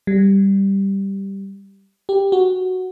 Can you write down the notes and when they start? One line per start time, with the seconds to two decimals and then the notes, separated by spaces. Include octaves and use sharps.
0.07 G3
2.09 G4
2.32 F#4